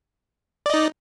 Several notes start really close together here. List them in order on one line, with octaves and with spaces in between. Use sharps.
D5 D#5 D#4